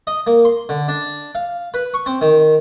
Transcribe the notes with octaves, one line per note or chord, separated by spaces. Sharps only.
D#5
A#3
C6
D3
D4
F5
B4
C#6
C4
D#3